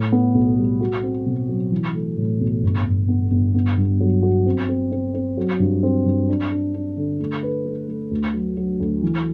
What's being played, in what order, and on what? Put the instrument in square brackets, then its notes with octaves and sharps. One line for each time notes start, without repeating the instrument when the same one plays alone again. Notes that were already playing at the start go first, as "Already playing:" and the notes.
Already playing: [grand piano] A2
B3
B1
G3
F#4
C4
B2
F#3
E3
A3
A2
B1
G1
G1
B3
G1
B3
G2
F#3
F#4
C4
C4
C4
C4
F#3
G2
C4
G2
D4
D4
D4
D3
A3
B4
A3
A3
D2
F#3
F#3
D2
E3